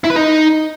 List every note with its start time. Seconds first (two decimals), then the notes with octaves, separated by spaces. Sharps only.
0.04 E4
0.10 B4
0.16 D#4